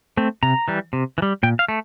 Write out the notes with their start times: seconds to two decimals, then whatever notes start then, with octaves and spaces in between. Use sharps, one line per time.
0.17 A3 C4
0.43 C3 A#5
0.68 E3 G3
0.93 C3
1.18 E3
1.22 G3
1.43 A#2 G5
1.59 F5
1.69 A3